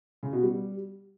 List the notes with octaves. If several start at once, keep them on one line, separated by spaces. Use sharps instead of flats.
C#3
B2
G3